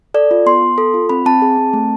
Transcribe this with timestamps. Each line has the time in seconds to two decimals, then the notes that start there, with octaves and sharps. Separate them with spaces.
0.14 A4 D5
0.31 F4
0.46 B3 C6
0.62 B3
0.78 A4
0.94 F4
1.09 C4 B5
1.26 C4 A5
1.42 G#4
1.57 C4
1.73 A3